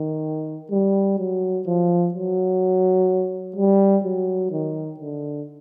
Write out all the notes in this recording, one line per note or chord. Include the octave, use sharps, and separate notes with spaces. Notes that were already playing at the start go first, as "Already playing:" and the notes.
Already playing: D#3
G3
F#3
F3
F#3
G3
F#3
D#3
D3